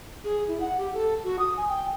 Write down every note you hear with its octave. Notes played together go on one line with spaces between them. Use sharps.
G#4
E4
F#5
G4
A4
F#4
D#6
G#5
G5